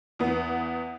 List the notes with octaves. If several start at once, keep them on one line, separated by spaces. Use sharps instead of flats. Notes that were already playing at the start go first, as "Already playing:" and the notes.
E2 B3